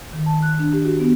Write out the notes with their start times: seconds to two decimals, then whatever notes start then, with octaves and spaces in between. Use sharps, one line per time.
0.13 D#3
0.26 A5
0.42 F#6
0.59 D4
0.73 G4
0.85 F#4
1.00 B3